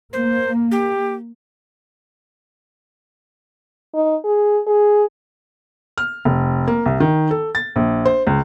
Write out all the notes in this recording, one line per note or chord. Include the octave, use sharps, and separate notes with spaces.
A#3 C5
G4
D#4
G#4
G#4
F6
F1
A#3
C2
D#3
A4
A6
A#1
C5
C#2